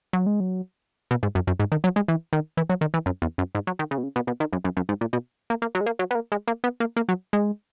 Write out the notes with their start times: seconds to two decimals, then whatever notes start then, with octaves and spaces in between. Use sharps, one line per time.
0.13 F#3
0.26 G#3
0.40 F#3
1.11 B2
1.23 G#2
1.35 F#2
1.47 F#2
1.60 G#2
1.72 D#3
1.84 F#3
1.96 G#3
2.08 E3
2.33 D#3
2.57 E3
2.70 F#3
2.81 D#3
2.94 E3
3.06 F#2
3.22 E2
3.38 F#2
3.55 G#2
3.67 F#3
3.79 D#3
3.91 C#3
3.98 B2
4.03 C#3
4.16 B2
4.27 B2
4.40 D#3
4.53 F#2
4.64 F#2
4.77 F#2
4.89 G#2
5.01 A#2
5.13 B2
5.50 A#3
5.62 A#3
5.75 F#3
5.81 G#3
5.86 A#3
5.99 F#3
6.11 B3
6.15 A#3
6.32 G#3
6.48 A#3
6.64 B3
6.80 A#3
6.97 A#3
7.09 F#3
7.33 G#3